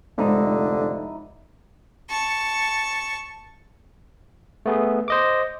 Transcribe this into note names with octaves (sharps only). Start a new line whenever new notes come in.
F1 G#2 D3 D#4 E4
A5 C#6
A3 B3 G#4
C5 D#5 D6